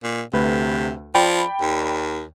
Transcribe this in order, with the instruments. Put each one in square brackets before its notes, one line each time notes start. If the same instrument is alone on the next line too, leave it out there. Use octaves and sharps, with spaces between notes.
[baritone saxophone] A#2
[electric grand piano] D2 A3 B4 [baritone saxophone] C3
[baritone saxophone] F3 [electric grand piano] D5 G5 B5
[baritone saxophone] D#2